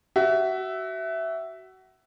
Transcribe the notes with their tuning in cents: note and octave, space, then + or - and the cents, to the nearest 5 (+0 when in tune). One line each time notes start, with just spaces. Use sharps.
F#4 +30 E5 +0